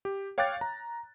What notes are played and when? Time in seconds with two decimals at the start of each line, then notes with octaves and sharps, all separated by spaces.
0.05 G4
0.38 C#5 F5 G5 D6 F#6 A6
0.61 A#5